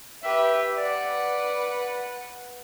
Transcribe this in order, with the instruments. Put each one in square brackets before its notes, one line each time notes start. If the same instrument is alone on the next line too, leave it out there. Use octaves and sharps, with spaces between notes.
[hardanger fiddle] G4 B4 [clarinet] E5
[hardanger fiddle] B4 F#5 [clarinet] D5